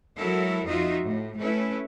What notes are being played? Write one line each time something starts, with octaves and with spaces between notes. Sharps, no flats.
F#3 G#3 E4 F#4 A4 A#4
F2 D#4 F4 F#4 D#5 E5
A2
A3 C#4 E4 A4 B4